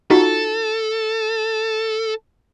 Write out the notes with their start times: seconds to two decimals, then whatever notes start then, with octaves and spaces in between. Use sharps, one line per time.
0.10 D#4 F4 F#4 A4